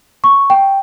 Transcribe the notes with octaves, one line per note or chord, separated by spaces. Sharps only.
C#6
G5